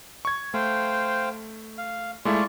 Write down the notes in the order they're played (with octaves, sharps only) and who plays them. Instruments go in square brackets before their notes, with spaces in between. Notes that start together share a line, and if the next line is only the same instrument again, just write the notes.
[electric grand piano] C#6 G#6
[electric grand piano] A3 [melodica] C5 F5 G5
[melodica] F5
[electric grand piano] G#3 A3 E4 [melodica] F4 D5 C#6